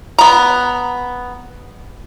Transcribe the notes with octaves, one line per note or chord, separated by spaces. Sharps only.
B3 A#5